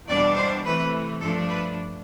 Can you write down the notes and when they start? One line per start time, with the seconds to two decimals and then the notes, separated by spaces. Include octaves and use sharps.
0.09 E2 B2 G3 D4 D5
0.37 C5
0.65 C3 E3 A3 B4
1.21 G2 F3 A3 D4 A4
1.49 B4